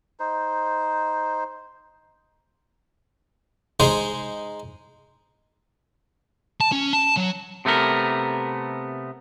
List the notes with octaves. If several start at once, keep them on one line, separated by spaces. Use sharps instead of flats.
D#4 C5
G#3 D#4 G#4 C5
A5
C#4
A5
F#3
C3 A3 B3 A#4